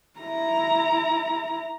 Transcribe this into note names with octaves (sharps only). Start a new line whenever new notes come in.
E4 A#5